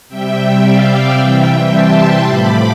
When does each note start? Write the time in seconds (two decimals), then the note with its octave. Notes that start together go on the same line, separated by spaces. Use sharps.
0.08 C3 G3 E5 G5
0.62 D5 F5
1.16 C3 E3 G3 E5 G5
1.70 A5 C6
2.24 A2 F3 B5 D6